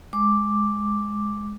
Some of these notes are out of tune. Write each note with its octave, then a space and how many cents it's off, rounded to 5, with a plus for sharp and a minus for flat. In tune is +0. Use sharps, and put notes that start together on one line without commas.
G#3 +0 D6 +0